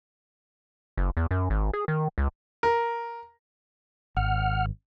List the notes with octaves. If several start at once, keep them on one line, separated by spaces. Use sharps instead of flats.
F#1
E2
F#2
G#1
G#4
D#3
C#2
A#4
G#1 F#5 F6